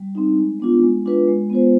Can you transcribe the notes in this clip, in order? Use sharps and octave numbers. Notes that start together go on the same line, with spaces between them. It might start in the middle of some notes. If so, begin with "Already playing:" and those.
Already playing: G3
C4 D#4
G#3
B3 D4 F4
G#3
D4 F4 B4
G#3
B3 F4 C5